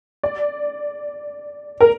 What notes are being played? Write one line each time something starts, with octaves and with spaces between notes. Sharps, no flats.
D5
A#4